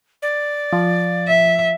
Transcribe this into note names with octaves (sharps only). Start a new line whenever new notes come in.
D5
F3
E5